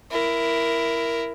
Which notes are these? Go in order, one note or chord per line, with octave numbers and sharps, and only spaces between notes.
E4 A#4